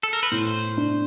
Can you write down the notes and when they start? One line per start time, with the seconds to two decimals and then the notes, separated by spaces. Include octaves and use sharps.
0.03 A4
0.13 A#4
0.23 B4
0.32 A2 C5
0.77 D4